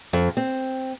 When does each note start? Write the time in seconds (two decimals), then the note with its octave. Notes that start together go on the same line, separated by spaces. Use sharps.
0.13 F2
0.37 C4